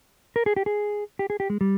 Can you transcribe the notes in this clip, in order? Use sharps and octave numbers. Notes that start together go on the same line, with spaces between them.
A#4
G#4
G4
G#4
G4
G#4
G4
G#3
G3